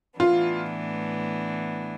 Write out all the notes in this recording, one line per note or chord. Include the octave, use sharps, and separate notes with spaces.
A2 E3 B3 D4 F4